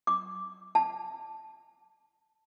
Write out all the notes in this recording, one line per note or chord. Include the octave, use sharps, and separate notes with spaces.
D6
A5